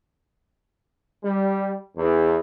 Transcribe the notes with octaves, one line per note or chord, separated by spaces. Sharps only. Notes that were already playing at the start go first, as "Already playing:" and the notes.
G3
E2